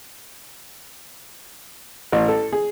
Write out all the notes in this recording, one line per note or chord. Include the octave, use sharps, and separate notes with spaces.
A1
A4
G#4